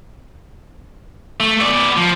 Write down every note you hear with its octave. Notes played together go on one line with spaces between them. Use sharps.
A3
B3 D5
F3